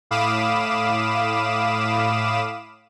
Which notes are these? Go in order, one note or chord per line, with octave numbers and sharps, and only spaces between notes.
A2 F5 B5 D6 D#6 E7